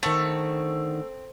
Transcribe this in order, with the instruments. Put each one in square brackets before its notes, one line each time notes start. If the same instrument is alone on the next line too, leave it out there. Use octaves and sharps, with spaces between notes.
[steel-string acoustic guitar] D3 D#3 [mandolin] A3 [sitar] C4